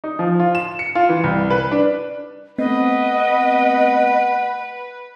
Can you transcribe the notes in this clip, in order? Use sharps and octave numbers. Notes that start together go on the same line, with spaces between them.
D#4
F3
F4
E7
C#7
F4
E3
C2
B4
D4
A3 B3 C4 B4 D#5 F#5